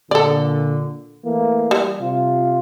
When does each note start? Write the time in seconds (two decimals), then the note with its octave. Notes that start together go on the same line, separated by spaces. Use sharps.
0.11 A#2 D3 A4 D5
1.26 E3 A3 A#3
1.71 G3
2.00 C3 F4